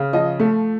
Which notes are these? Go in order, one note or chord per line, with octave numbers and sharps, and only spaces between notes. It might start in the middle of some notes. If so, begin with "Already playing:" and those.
Already playing: C#3
F3 D#5
A3